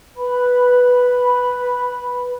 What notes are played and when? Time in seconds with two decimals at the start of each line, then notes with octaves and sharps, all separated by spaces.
0.17 B4 B5